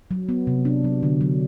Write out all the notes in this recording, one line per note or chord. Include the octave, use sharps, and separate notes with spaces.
F#3
B3
C3
D4
F#3
D3
F#3